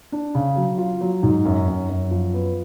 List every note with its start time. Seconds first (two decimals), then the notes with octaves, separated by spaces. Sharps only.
0.12 D4
0.35 C#3
0.56 F#3
0.78 F4
1.01 F#3
1.23 G#2
1.45 F#2
1.68 F#2
1.89 F#2
2.11 F3
2.34 B3